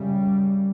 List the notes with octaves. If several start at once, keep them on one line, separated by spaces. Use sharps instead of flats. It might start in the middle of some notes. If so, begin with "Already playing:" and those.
Already playing: F#2 C#3 G3